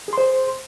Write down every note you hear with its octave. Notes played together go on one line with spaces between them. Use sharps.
G#4 C5 C6